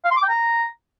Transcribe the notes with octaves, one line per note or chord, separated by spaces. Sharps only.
F5
C6
D6
G5
A#5